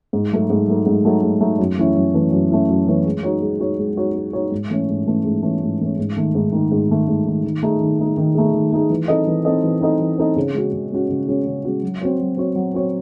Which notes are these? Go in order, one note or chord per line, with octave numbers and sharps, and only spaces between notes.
G#2
F#3 A3 D#4 A4
G#2
F#3 A3 D#4 A4
G#2
F#3 A3 D#4 A4
G#2
F#3 A3 D#4 A4
F#2
E3 A3 C#4 E4
F#2
E3 A3 C#4 E4
F#2
E3 A3 C#4 E4
F#2
E3 A3 C#4 E4
G#3
D#4 F#4 C#5
G#3
D#4 F#4 C#5
G#3
D#4 F#4 C#5
G#3
D#4 F#4 C#5
G#2
E3 A3 C#4
G#2
E3 A3 C#4
G#2
E3 A3 C#4
G#2
E3 A3 C#4
G#2
D#3 A3
G#2
D#3 A3
G#2
D#3 A3
G#2
D#3 A3
D#3
A3 D#4 G#4
D#3
A3 D#4 G#4
D#3
A3 D#4 G#4
D#3
A3 D#4 G#4
E3
C4 D#4 A4 D#5
E3
C4 D#4 A4 D#5
E3
C4 D#4 A4 D#5
E3
C4 D#4 A4 D#5
C#3
G#3 C#4 F#4
C#3
G#3 C#4 F#4
C#3
G#3 C#4 F#4
C#3
G#3 C#4 F#4
F#3
C4 F#4 C#5
F#3
C4 F#4 C#5
F#3
C4 F#4 C#5